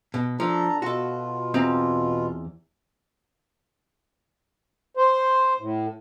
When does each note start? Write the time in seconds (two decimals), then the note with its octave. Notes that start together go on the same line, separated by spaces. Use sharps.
0.14 B2
0.40 F3 D4 A4 A#5
0.82 B2 F4 F#4 A4
1.54 E2 C4 A#5
4.97 C5
5.60 A2